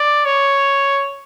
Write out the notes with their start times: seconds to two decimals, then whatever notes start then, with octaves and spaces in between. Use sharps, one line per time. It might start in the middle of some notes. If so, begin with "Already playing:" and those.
Already playing: D5
0.25 C#5